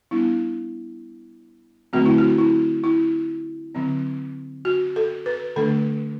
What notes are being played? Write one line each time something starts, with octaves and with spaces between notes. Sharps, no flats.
G3 B3 D4 E4
D3 F#3 A3 C4 F#4
E4
F#4
E4
E4
D3 F#3 C4
F#4
A4
B4
D3 A3 D4 A4